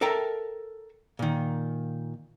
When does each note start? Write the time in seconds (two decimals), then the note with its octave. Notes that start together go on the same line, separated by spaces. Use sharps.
0.01 A4 A#4 E5 G5 A5 A#5
1.19 A#2 D#3